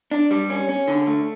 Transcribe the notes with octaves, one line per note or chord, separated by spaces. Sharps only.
D4
G3
C#4
C#4
D3
A3